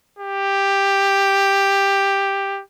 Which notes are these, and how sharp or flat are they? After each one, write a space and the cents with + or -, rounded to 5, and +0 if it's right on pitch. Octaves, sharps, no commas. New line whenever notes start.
G4 +10